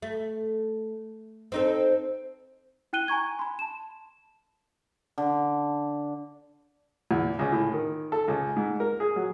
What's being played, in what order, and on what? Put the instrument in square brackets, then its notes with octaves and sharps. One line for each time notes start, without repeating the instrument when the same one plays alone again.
[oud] A3
C4 D#4 A4
[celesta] E4 G5 F#6 D#7 G7
G#5 A#5 C#6 G#6
B5 C6
A5 E7
[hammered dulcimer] D3
[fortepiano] E2
C#2
A2
D#3
A4
C#2
G#2
A#4
G#4
F#3